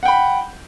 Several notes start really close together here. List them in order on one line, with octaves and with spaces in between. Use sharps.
F#5 G5 B5